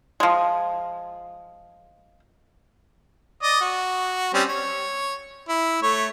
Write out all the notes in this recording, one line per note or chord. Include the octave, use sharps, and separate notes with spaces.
F3 G#3
D5 D#5
F#4
G3 C4 C#4
C#5
E4
A3 C#5